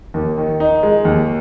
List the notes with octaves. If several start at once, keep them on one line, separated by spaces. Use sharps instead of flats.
D#2
D#3
D#4
G#3
D#2